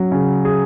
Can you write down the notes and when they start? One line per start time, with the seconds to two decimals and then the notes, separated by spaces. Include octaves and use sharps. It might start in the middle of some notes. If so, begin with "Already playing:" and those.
Already playing: F#3 C#4
0.12 C#3
0.45 G#4